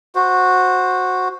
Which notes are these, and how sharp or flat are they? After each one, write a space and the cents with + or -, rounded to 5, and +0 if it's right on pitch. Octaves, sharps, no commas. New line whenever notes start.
F#4 -10 C5 +0